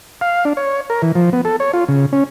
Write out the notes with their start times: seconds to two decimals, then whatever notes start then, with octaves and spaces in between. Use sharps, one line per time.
0.21 F5
0.45 D4
0.57 C#5
0.90 A#4
1.02 E3
1.15 F3
1.33 B3
1.45 A4
1.60 C#5
1.73 F4
1.88 C#3
2.13 C#4